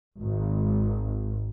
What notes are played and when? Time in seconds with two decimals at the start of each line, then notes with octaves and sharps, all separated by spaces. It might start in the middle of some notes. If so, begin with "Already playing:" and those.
0.19 G#1